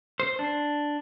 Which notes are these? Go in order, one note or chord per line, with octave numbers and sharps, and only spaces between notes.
C5
D4